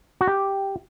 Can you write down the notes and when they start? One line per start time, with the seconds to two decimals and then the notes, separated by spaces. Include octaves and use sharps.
0.21 F#4
0.27 G4